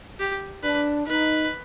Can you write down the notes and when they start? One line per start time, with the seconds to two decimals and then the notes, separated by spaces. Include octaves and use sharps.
0.20 G4
0.63 D4 B4
1.07 D#4 B4